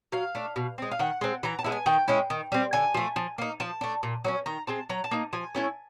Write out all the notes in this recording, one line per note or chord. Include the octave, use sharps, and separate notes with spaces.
F#3 F5
A3 D4
B2
G#3 C4
F5
D#3 F#5
G#3 C4
E3 A#5
A5
G#3 B3 E4
G#5
D#3 G5
G#3 C#4 E4
D#3
G3 C4
D3 G#5
F3 A3
F3
A#3 D#4
F3 A5
A3 D4
A#2
F#3 A#3 C#4
D#3 A#5
G#3 C4 A5
F#3 A#5
A5
A#3 D#4
F3 G#5
A3 C#4 E4